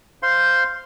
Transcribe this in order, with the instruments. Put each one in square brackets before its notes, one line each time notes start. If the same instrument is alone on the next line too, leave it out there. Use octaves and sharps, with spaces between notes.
[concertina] C5 F5 C6